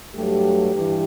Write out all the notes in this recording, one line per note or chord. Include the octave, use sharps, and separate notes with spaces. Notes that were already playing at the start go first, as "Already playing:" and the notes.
G2 F#3 A3 G4
G2 E3